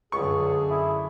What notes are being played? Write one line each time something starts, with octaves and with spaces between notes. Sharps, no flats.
C#2 F#2 D3 G#4 C#6
E4